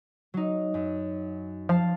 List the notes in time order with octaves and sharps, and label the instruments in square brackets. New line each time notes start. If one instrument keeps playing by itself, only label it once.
[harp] F#3 D#4
F#2
[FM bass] F3 [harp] F5 A5